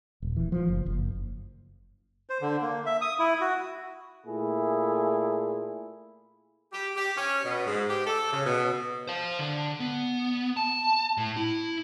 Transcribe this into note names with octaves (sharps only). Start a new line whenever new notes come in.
D#1
E3
F3
F#1
F#1
C5
D3
A#3
E5
D#6
E4
F#4
A#2 A3 E4 G#4
G4
G4
C#4
B2
G#2
G4
A4
C#3
B2
C5 F5
D3
B3
A5
A2
E4